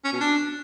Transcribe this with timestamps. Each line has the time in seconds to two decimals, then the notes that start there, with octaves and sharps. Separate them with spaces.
0.05 C#4
0.13 B2
0.21 D4